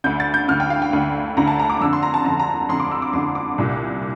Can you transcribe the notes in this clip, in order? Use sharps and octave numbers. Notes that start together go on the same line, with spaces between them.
D2 D3 G6
A6
G6
D2 D3 F6
G5
F5
G5
D2 D3
D2 D3 A#5
A5
A#5
D6
F2 D3 E6
C6
A#5
A5
F2 D3 A#5
A#5
F2 D3 C6
D6
E6
D6
F2 D3 C6
D6
C2 A#2